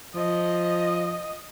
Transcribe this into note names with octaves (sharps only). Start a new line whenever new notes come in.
F3 D#5